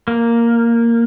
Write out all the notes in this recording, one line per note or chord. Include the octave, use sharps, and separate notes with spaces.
A#3